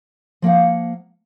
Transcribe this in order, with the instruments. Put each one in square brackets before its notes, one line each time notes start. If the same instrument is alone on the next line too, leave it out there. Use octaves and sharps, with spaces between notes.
[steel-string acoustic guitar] F3 A#3 F5 F#5